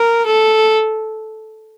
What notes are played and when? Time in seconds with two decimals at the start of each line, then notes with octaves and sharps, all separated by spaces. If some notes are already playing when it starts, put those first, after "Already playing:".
Already playing: A#4
0.26 A4